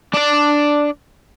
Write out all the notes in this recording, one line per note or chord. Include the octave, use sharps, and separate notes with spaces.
D4 D5